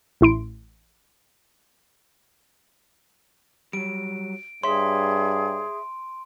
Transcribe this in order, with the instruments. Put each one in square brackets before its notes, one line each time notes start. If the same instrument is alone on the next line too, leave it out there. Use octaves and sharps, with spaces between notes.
[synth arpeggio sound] A1 E4 C6 D7
[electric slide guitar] F#3 G3 [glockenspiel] D7
[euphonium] G2 [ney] G#4 [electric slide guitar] C#5 E5 [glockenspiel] C6